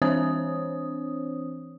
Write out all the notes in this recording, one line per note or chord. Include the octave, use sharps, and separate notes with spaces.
E3 C4 D4 C5 C#5 D#6